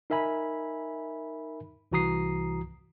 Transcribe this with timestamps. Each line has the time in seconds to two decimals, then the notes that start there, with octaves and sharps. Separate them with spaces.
0.10 D#4 A#4 E5 G#5 B5
1.92 C2 E3 F#4 A#5 D#6 C7